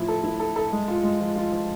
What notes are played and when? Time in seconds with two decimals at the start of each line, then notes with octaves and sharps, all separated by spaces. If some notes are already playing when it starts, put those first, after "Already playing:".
Already playing: A2 F3 E4
0.08 A4
0.24 E4
0.40 A4
0.56 A4
0.72 G#3
0.88 F4
1.03 G#3
1.20 F3
1.36 F4
1.52 F3